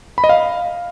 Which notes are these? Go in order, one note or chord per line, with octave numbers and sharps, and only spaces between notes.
B5
D#5
F5